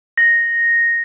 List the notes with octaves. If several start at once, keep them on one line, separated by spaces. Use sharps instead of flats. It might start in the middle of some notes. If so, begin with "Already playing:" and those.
A#6